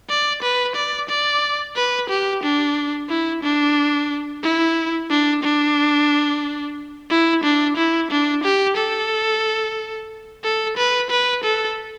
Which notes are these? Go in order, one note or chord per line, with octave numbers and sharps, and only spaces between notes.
D5
B4
D5
D5
B4
G4
D4
E4
D4
E4
D4
D4
E4
D4
E4
D4
G4
A4
A4
B4
B4
A4